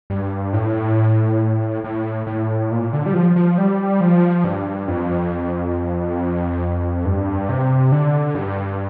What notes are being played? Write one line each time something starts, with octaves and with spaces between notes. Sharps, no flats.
G2
A2
A2
A2
A#2
D3
G3
F3
F3
G3
F3
G2
F2
G2
C3
D3
G2